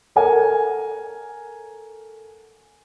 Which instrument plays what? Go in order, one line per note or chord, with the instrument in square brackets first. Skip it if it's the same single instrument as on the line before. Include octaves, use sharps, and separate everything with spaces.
[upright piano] A4 A#4 C#5 F#5 G#5